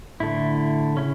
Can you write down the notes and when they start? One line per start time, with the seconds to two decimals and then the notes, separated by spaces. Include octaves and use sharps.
0.20 A2 D3 A3 E4
0.96 C#3 C#4 E4